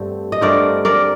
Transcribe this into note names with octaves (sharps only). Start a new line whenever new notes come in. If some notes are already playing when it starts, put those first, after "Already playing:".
Already playing: G2 D3 A3 C4
D#5
G2 D3 A3 C4 A#4 D5
A#4 D5